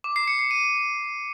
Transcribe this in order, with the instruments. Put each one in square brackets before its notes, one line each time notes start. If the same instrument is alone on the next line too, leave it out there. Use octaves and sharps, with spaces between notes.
[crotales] D6
C7
C#7
C7
D#7